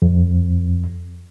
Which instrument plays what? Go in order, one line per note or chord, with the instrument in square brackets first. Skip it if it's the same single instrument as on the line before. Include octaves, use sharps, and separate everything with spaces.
[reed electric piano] F2